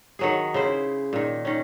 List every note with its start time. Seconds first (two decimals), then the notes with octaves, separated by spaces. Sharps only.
0.19 D#3 F#3 G#4
0.54 C#3 E4 C5
1.13 A#2 D#3
1.45 D#3 C#4